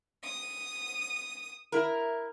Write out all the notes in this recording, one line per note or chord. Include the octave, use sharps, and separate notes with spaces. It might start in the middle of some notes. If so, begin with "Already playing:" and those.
D#6
E4 A#4